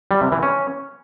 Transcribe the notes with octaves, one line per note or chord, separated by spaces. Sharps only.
G3
C3
E3
C#4